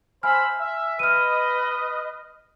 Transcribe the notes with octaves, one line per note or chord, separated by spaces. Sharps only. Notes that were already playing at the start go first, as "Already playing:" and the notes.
C5 E5 G#5 B5 F6
E5
B4 D#5 F6 D#7